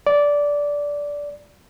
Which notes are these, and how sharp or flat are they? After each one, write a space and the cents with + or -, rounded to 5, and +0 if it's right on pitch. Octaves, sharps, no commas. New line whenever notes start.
D5 -15